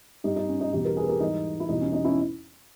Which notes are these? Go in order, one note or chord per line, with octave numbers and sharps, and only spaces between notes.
G2 G3 D#4 G4
D#4
C#4
D#4
E2 B2 G3 D#4 G4
G4 A#4
G#4 B4
G4 A#4
G#2 E3 G3 D#4
E4
E2 B2 G3 D#4
C#4
D#4
C#4 E4